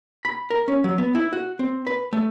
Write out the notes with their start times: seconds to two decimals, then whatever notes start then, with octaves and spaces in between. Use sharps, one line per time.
0.25 B5
0.50 A#4
0.68 C#4
0.84 F#3
0.98 B3
1.15 E4
1.33 F#4
1.59 C4
1.87 B4
2.13 A3